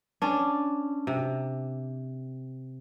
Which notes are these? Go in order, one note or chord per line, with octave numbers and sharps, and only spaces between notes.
C#4 D4
C3